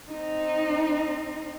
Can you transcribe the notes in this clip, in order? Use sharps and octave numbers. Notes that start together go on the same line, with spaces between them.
C4 D#4